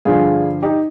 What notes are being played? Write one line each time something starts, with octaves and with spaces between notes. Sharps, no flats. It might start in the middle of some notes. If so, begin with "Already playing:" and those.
G2 D3 F3 F4 G#4
D#4 G4